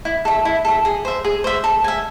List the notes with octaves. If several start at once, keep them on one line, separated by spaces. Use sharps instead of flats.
E4
A4 E5
E4
A4 E5
G#4
C5 E5
G#4
C5 E5
A4
E5 G#5